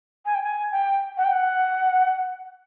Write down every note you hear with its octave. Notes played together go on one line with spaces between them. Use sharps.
G#5
G5
G#5
G5
F#5
G5
F#5